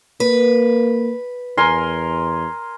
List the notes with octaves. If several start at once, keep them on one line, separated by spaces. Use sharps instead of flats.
A#3 B4
E2 A#4 G#5 C6